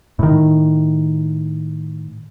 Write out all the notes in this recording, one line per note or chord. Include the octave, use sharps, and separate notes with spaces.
A2 D#3